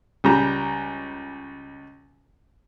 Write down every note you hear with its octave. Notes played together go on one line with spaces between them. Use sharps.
C#2 G3 A#5